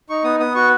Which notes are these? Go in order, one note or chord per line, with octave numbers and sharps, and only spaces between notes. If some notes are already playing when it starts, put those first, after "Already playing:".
D#4 C#6
B3 D#6
B3 D#6
F#4 C#6